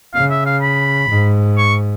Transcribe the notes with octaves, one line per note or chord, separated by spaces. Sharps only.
C#3 F5
E5
F5
B5
G#2
C#6